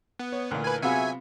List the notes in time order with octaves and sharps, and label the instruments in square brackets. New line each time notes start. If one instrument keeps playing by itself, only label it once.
[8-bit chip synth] B3
[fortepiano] C#5
[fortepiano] D2 A#2 [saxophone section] E3 A#3 A#4
[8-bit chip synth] B4 G#5
[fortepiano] C3 B3 F4 [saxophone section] F#3 F#4 G#4 [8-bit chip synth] E5 G#5